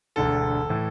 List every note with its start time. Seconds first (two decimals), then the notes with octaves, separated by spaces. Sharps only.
0.16 E1 D2 D3 A4
0.69 A2 E3